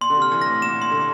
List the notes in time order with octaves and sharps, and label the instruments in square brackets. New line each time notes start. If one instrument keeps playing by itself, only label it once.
[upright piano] A#2 [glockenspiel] C6
[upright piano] D3
C3
[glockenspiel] F6
[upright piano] E3
[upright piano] A2 [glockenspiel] A#6
[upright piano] A#2 [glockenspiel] E7
[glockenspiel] C6
[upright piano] D3